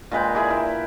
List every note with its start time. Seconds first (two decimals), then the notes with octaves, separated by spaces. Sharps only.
0.12 A#2 G#3 B4 G5
0.35 E4 G#4 D5
0.50 E4 G5